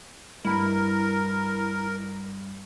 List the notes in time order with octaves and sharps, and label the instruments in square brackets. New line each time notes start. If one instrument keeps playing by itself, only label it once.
[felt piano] G2 B5 [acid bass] E4 [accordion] A#4